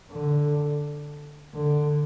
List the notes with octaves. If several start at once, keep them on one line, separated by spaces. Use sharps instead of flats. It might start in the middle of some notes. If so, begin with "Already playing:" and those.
D3
D3